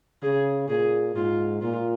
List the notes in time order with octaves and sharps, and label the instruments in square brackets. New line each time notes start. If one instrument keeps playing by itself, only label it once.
[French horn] C#3 [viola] G#4
[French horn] A#2 [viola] G#4
[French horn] G#2 [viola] F4
[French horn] A#2 [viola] F4